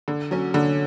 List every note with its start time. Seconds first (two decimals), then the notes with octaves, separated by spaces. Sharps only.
0.08 D3
0.31 F#3 C#4
0.54 D3